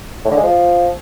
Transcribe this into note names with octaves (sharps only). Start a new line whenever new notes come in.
A2
D3
G#3
F3